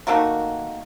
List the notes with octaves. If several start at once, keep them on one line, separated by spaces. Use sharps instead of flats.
D#3 A3 A#3 F#4